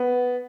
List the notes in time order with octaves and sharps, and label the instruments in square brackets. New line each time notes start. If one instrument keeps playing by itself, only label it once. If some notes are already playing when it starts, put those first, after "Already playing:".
Already playing: [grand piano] B3